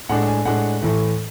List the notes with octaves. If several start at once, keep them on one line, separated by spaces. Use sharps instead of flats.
A2 G#3 D4 F#5
G#5
A2 G#3 D4 F#5
A2 E3 A3